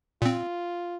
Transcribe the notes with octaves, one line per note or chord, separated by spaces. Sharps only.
A#2 C4 F4